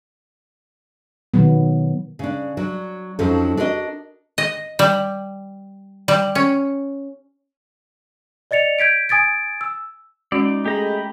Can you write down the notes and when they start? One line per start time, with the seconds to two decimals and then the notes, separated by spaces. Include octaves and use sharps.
1.34 B2 D#3 F#3 B3
2.19 C#3 D4
2.57 F#3 D4
3.19 F2 F3 F#3 C#4 D#4 A4
3.57 D4 F#4 A#4 C5 D#5
4.38 D#5
4.79 G3
6.08 G3
6.35 C#4
8.51 D5 D#5 A6 C#7 F7
8.79 G6 G#6 B6 D7
9.09 G#5 D#6 G#6 A6 D7
9.61 E6
10.32 G#3 C#4 D#4 F#4 D5
10.66 A3 G4 G#4 D#5 A#5 B5